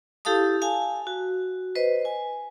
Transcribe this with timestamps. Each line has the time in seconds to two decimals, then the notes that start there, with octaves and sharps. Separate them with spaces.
0.25 E4 G4 A4 F5 A5 D#6
0.62 F5 G#5 A5
1.07 F#4
1.75 B4 C5 D#5
2.05 G#5